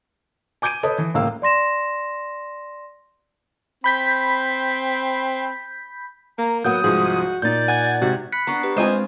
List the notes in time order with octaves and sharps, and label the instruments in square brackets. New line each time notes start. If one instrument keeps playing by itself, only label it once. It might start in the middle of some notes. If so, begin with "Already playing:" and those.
[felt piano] G#5 D6 G6 G#6 D7 D#7
A4 B4 C#5 D#5 D#6
E3
C#2 A2 A#3 F5 E6
[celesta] D5 C6 A#6 E7
[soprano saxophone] C4 [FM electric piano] B5 G6 B6
[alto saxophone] A#3 [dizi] A#5
[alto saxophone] F#3 [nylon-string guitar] A#3 B3 [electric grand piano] F#5 G6 [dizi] D#6
[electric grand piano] C2 G#2 G#4 [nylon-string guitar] F3 [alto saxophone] F#4
[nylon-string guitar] A#2 D#4 [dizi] D5 [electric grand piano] G6 A6
[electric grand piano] F#5 G#6 [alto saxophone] G#5
[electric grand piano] G#2 C3 [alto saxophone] F#4
[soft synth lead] B5 [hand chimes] F#6 B6 C#7
[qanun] B3 D4 [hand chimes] A#5 C#6 [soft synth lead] C7
[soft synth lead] G4 [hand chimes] B4
[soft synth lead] G#3 [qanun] C4 F4 G#4 [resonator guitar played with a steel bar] C5 D#5 G#5